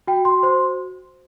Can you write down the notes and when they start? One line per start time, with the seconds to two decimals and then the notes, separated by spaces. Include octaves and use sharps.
0.07 F#4 G5
0.25 C6
0.43 C5 C6